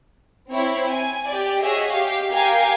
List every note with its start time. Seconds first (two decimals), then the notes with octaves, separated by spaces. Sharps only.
0.52 C4 E4 C#5
0.89 G#5
1.29 G4 D5
1.61 F#4 G#4 C#5 D#5 E5
1.91 G4 F5
2.32 G4 A#4 F5 G5 G#5